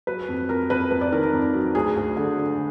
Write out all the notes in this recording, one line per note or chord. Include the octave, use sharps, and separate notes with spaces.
F#3 B4
F2
F2 A#4
F2 B4
F2 B4
D5
D#3 A#4
A#4
F2
F#3
D2 G#4
D2
D3
D3